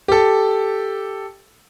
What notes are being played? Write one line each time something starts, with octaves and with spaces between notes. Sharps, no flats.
G4 A4